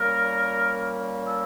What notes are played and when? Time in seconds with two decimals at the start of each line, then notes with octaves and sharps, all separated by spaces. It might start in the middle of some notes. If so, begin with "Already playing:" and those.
Already playing: A#2 G3 A#3 C#4 A#4
1.26 A4